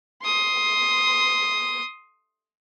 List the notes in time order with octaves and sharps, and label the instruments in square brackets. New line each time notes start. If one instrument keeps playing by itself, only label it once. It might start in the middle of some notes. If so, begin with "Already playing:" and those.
[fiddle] C6 D#6